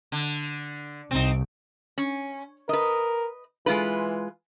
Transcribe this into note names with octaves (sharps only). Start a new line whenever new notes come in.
D3
C2 C4 D#4
C#4
A#4 B4 D#5
E3 G#3 F4 B4